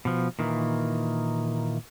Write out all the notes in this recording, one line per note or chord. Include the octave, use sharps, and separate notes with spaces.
B2 F3
A#2 D#3 E3